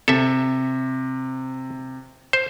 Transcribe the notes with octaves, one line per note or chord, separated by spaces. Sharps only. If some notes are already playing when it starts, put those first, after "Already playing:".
C3 A4 E5
C5